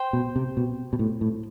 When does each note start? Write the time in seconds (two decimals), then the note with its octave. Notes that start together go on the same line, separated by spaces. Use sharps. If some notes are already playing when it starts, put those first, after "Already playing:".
Already playing: C5 G5
0.13 B2
0.36 C3
0.57 B2
0.93 B2
0.99 A2
1.21 A2